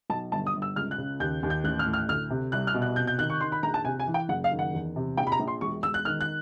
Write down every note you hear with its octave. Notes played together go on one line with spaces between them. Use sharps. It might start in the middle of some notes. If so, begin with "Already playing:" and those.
B1 A5
G1 A5
D#6
G1
E6
C#2 F6
F#6
C#3
D#2 G6
D#2
G6
A1 F#6
F6
A2
F6
D2 F6
C3
C2 F#6
F6
B2
F#6
C3 G6
G6
D#3 F#6
C#6
D#3 C6
B5
A#1 A#5
A5
C3 G#5
G#5
E3
G5
F#1 F#5
F5
D#3
F#5
E2
C3
A#1 G5
B5
A#5
A#1
C6
E1 C#6
E1 E6
F#6
D#3 F6
F#6